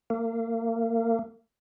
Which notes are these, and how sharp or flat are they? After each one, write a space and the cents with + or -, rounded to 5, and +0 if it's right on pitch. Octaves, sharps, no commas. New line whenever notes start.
A#3 -30